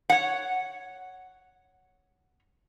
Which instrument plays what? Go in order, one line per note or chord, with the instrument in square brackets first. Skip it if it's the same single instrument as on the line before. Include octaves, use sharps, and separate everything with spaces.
[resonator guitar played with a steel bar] C#5 F#5